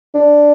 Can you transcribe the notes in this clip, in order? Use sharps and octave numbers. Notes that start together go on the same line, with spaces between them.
D4